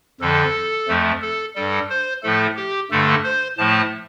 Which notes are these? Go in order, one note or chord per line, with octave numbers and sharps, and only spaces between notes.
F2 D3 F3 A4
F2 F3 A3
A4
G2 G3 A4
C5
A2 F3 A3 A4
G4
G2 D3 A3 A4
C5
A2 F3 A3 A5